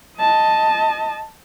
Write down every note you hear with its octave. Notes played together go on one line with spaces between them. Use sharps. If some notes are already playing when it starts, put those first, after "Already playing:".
D#5 A5